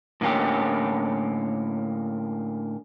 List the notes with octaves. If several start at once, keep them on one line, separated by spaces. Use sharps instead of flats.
A2 D3 A#3 C#4 G4